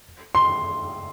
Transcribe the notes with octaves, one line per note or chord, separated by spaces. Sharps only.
C6